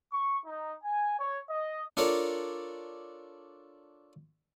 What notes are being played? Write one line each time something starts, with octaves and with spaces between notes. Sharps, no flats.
C#6
D#4
G#5
C#5
D#5
D4 F4 A4 A#4 C#5 D5